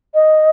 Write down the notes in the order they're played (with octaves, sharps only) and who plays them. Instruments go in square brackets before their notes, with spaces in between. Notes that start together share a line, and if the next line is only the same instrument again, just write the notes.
[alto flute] D#5